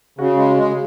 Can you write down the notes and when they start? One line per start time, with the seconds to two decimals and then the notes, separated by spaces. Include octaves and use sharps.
0.19 C#3 F#4
0.37 G#3
0.57 G#3